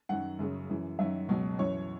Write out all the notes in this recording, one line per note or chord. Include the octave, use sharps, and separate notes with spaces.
F#2 D#3 F#3 F#5
F#2 C#3 F#3
F#2 E3
F#2 D#3 F#3 E5
C#2 B2 F#3
F#2 E3 C#5